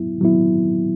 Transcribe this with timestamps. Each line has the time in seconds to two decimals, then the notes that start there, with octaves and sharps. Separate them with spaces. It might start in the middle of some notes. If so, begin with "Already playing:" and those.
Already playing: F#3 B3 E4
0.21 F#3 B3 E4